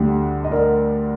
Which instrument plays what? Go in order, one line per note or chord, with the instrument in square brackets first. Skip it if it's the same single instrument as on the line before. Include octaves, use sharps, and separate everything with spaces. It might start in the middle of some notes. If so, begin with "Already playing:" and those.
Already playing: [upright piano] D2 D3 G3
D#5
A#4 D5